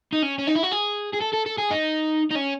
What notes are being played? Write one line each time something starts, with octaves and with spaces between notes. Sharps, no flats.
D#4
C#4
C#4
D#4
E4
F#4
G#4
G#4
A4
A4
A4
G#4
D#4
D#4
C#4